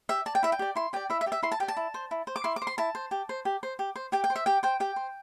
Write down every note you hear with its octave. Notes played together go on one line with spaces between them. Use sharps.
G4 E5
D5 A5
G5
E4 E5
G5
G4 D5
E4 C6
G4 D5 G5
E4 E5
E5
G4 D5
E5
E4 C6
A5
G4 D5 G5
A5
E4
C5
E4
C5
D6
E4 C6
D6
C5
C6
E4 A5
C5
G4
C5
G4
C5
G4
C5
G4 G5
G5
C5
E5
G4 G5
C5 G5
G4 G5
C5